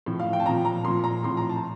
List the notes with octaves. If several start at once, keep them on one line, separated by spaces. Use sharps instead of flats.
A2 F3
F5
G5
A5
A#2 F3 A#5
A#5
A#2 F3 C6
A#5
A2 F3 C6
A#5
A5